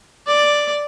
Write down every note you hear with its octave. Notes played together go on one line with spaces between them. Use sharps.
D5